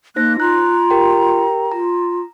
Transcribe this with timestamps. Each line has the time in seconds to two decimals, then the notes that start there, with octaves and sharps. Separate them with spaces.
0.16 A#3 D#4 C5 F#6 A#6
0.40 F4 A#5 F#6
0.90 G4 A#4 G5
1.72 F4 A#5